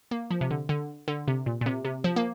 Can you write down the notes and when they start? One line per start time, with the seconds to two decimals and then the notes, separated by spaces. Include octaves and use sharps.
0.11 A#3
0.31 F3
0.41 C3
0.51 D3
0.69 D3
1.08 D3
1.28 C3
1.46 A#2
1.61 A#2
1.66 C3
1.85 C3
2.04 F3
2.16 A#3